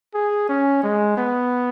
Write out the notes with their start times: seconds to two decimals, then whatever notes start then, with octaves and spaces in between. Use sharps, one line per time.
0.15 G#4
0.49 C#4
0.83 G#3
1.18 B3